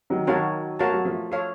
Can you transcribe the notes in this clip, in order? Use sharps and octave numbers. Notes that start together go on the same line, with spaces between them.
D#3 F#3
D#3 F#3 F#4 A#4 C#5 F5 A5
A3 F#4 A#4 C#5 F5 A5
F#3
F3 A3
A4 C#5 F5